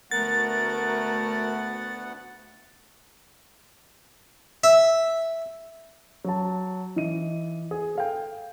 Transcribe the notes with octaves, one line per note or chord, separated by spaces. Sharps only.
D2 A3 B3 F#4 A#4 F#5 A6
E5
F#3 A5
E3 D#5 D#7
G#4
A4 F5 G5